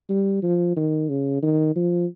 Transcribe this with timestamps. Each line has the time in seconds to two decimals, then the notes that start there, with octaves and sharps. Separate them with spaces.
0.09 G3
0.43 F3
0.76 D#3
1.09 C#3
1.43 D#3
1.76 F3